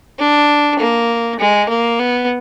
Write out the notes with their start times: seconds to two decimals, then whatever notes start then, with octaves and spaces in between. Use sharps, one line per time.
0.19 D4
0.80 A#3
1.40 G#3
1.69 A#3
2.00 B3